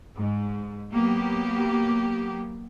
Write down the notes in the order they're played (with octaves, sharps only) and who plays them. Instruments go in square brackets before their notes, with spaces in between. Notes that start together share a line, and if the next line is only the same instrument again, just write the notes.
[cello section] G#2
F#3 A#3 B3 G4